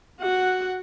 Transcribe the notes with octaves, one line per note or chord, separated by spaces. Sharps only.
F#4 F#5